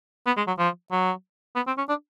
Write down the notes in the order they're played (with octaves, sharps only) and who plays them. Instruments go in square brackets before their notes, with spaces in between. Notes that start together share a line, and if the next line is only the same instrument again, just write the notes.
[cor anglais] B3
G#3
F#3
F3
F#3
B3
C4
C#4
D4